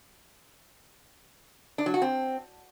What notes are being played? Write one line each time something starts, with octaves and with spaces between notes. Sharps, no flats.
D4
F#3
F#4
C4